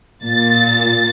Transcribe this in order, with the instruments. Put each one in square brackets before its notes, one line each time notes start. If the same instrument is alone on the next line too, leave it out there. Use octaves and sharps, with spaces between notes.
[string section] A#2 A6